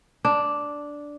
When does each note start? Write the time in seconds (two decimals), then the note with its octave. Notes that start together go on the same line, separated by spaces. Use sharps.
0.25 D4